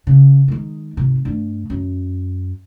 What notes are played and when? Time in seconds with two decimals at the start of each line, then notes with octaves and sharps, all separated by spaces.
0.07 C#3
0.48 D#3 G#3
0.97 G#1 C3
1.25 G2 A3
1.70 F#2